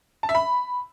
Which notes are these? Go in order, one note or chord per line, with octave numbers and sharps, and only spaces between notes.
A5
E5
B5